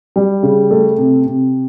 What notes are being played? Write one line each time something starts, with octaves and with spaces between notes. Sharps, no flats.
G3
C#3
A3
C3
C3